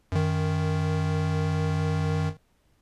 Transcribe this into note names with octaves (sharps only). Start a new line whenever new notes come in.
F#2 D#3